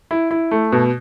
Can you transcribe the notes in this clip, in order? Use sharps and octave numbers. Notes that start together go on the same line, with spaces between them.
E4
E4
A3
B2